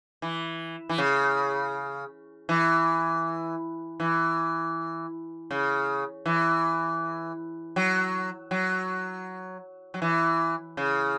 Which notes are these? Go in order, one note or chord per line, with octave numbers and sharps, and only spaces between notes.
E3
E3
C#3
E3
E3
C#3
E3
F#3
F#3
F#3
E3
C#3